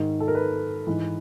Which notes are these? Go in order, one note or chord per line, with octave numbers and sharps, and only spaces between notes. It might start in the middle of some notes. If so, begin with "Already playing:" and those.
Already playing: G#2 D#3
A4
A#4
B4
G#2 E3